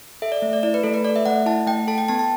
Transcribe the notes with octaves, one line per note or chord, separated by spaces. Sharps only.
A4 E5
D5
A3
D5
E4 D5
B4
A3 A4
B4
A4 D5
E5
A3 F#5
E4 A5
A3 G5
A4 A5
G5
B3 A5
A5